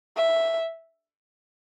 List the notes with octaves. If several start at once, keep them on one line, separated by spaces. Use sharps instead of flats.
E5